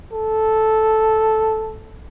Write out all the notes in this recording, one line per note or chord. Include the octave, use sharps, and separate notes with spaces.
A4